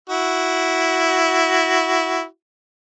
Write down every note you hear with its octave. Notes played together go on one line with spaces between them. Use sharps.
E4 F#4